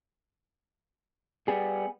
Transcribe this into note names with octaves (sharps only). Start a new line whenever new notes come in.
G3 B3 G#4